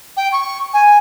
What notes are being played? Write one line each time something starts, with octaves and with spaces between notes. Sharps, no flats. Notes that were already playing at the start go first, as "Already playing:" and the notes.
G5
C#6
G#5